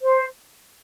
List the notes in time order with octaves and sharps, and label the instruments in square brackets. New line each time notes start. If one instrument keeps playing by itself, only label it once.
[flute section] C5